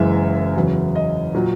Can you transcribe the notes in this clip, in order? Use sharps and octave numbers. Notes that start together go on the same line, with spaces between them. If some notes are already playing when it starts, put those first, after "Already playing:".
Already playing: F#1 F#2 E3 G#3 E5
E2 C#3 F#3
D#5
A#2 F#3